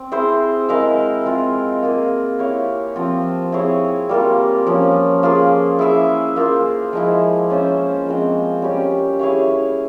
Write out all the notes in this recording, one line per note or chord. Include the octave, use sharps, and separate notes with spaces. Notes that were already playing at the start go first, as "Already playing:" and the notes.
Already playing: C4
E4 G#4 C5
G#3 E4 A#4 F5
G#3 C4 F4
A#3 F4 G#4
E4 G4 C#5 F5
F3 C4 F4
C4 E4 G#4 C#5
G3 A#3 F4
F3 A#3 C#4
A#3 F4 G#4
E4 G#4 E5
A#3 F4 G#4 C5
F3 G#3 E4
C#4 F4 C5 E5
F3 G#3 C4
G3 C#4 G4
E4 G#4 C#5 F5